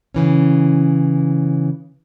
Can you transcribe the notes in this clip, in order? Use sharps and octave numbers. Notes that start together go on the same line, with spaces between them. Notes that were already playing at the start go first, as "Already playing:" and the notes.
C#3 E3 C#4